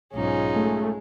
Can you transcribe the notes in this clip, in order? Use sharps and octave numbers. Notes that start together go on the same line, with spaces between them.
B1 G#2 C#4 D#4 F4 G#4
G#3 A3